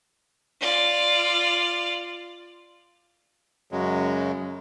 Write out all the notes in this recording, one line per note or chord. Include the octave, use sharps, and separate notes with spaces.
F4 D5
F#2 C#3 F#3 G#3